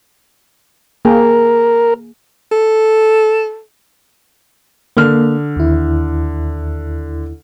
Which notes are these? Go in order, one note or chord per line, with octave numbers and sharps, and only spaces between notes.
A#3 G#4 A#4 G5
A4
D3 A#3 F6
D#2 E4